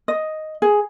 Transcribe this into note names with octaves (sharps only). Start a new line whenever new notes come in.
D#5
G#4